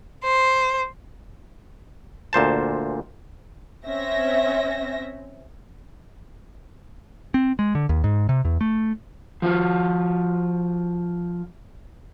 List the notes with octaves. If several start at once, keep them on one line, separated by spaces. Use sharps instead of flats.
C5
D2 A#2 C5 A5
C4 C#4 E5 A#6
C4
G#3
D3
D#2
G#2
C3
E2
A3
F3 F4 F#4